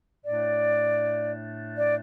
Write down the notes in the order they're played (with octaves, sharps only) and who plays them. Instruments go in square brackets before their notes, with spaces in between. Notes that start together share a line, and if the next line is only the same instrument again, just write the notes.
[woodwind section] A2 A3 D4 D5
D5